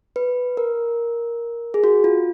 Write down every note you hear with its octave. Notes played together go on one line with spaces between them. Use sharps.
B4
A#4
G#4
F#4
F4